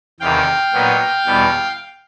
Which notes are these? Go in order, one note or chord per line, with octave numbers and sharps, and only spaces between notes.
E2 C3 D#3 F5 G5
A#2 F#3 B3 D#4
E2 B2 G3 B3